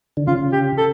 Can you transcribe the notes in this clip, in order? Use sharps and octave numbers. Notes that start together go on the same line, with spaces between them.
D3
C#3 F4
G4
A4